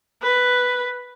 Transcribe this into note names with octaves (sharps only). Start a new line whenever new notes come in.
B4